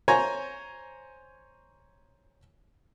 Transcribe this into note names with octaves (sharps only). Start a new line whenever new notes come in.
C5 C#5 G#5 A#5